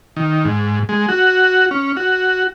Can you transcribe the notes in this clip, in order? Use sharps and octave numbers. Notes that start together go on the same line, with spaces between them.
D#3
G#2
G#3
F#4
C#4
F#4